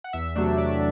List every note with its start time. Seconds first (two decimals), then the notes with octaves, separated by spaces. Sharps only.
0.04 F#5
0.13 E2 E5
0.35 C3 F#3 A3 D4
0.58 E2 D5